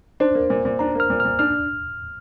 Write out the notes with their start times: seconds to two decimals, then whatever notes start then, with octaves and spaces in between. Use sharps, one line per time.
0.20 D4 C5
0.35 A#3
0.50 A#2
0.65 A#2
0.79 D4 A#5
0.95 A#3 F6
1.10 A#2
1.20 A#2 F6
1.39 D4 F6